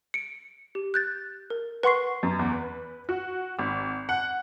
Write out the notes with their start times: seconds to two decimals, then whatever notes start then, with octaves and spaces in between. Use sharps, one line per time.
0.14 C#7 D7
0.75 G4
0.94 F#6 G6 A6
1.50 A#4
1.83 B4 F#5 C6 C#6 C7
2.23 F#2
2.39 E2
2.52 B4
3.09 F#4
3.59 G#1
4.09 F#5